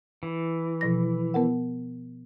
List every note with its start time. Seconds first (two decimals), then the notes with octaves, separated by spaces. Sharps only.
0.23 E3
0.81 B2 F3 A#6
1.34 B3 A#4 F#5